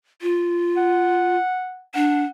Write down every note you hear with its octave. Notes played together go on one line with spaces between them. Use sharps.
F4
F#5
D4 F#5